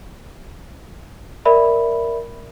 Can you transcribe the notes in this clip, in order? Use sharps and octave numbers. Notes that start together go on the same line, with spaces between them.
A#4 D5 E5 B5